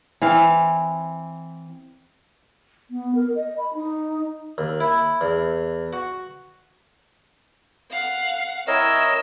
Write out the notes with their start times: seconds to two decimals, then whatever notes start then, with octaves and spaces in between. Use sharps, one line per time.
0.22 E3 C4 F5
2.91 B3
3.15 A#4
3.36 D#5
3.58 B5
3.74 D#4
4.58 D#2
4.81 E4
5.21 E2
5.93 F#4
7.92 F5 F#5
8.68 C4 E4 A#4 C#5 D#5 E6